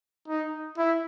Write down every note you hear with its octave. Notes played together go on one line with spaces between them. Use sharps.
D#4
E4